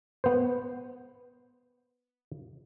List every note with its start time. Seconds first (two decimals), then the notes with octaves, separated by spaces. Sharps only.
0.24 B3 C5